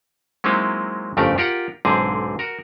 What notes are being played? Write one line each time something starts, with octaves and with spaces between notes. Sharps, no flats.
F#3 G#3 A#3 C4 D#4 E4
G1 F2 C#3 A3 G4 A#4
F4 G4 A#4 F#5
B1 G#2 D3 C4 G#4
F#4 A#4